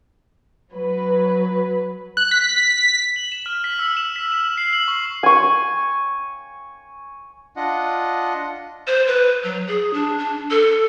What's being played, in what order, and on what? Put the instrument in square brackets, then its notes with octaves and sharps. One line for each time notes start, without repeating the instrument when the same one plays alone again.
[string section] F#3 B4
[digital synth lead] F#6
B6
[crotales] F#7
E7
F6
B6
E6
E7
B6
E7
C7
F#7
C#6
[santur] G#5 C#6
[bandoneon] D4 F4 D#5 F#5
[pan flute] C5
B4
F#3
G#4
D4
D4
A4